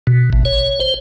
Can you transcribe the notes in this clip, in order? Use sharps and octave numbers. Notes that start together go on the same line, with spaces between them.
B2
A1
C#5
C5